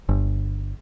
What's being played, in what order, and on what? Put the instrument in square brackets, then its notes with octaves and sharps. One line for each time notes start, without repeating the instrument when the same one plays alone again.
[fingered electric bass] G1